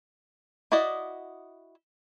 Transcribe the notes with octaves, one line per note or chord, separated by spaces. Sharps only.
E4 F#4 D5 D#5